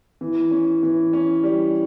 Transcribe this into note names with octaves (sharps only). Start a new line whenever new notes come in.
E3
C#4
E3
C#4
G3